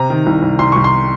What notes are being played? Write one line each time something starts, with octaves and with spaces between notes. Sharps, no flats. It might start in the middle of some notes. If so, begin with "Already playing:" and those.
Already playing: C3 A#5
D#3
C2
C2
C2 C6
C2 C#6
C6